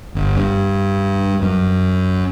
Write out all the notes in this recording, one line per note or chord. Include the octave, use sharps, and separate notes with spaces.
G1
G2
F#2